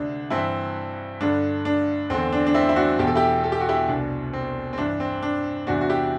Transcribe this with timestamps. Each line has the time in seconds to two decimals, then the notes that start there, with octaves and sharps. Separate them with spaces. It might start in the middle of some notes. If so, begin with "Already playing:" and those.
Already playing: D2 C3 D4
0.30 G2 E3 C4 E4
1.20 G2 D3 D4
1.65 D4
2.10 E2 D3 C4
2.33 D4
2.47 D4
2.54 C4 E4
2.69 E4
2.76 D4 F#4
2.99 E2 B2 G4
3.07 A4
3.15 E4 G4
3.44 A4
3.52 G4
3.60 F#4
3.69 E4 G4
3.88 C2 B2 D4
4.33 C4
4.73 C4
4.78 G2 E3 D4
5.00 C4
5.23 D4
5.67 E2 C3 E3 D4 F#4
5.81 F#4
5.89 E4 G4